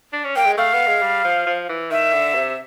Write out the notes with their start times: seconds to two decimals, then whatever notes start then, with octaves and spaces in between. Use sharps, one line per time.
0.13 D4
0.24 C#4
0.36 A#3 G5
0.46 G#3
0.58 A3 F5
0.73 B3
0.87 G#3
1.02 G3
1.25 F3
1.46 F3
1.69 E3
1.91 D#3 E5
2.13 D3
2.35 C3